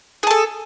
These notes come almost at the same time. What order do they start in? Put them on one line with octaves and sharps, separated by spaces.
G#4 A5 A4